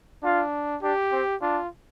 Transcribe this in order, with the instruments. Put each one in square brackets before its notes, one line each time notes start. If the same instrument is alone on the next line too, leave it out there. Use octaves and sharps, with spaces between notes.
[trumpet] D4 [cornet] F4
[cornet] D4 [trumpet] G4
[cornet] C4
[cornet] D4 [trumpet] F4